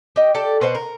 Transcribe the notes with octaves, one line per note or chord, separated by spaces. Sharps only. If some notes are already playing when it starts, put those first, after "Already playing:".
G4 D#5
G4 A4 D5
B2 B4 C5 F#5
A#4